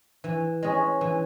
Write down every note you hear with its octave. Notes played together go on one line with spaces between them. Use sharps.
E3
G#3 C#4 G#4
E3